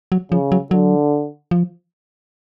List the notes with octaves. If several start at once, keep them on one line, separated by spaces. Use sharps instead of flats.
F#3
C#3 F3
F#3
D3 F#3
F3